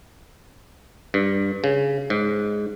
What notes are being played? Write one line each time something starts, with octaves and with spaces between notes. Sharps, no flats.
G2
C#3
G#2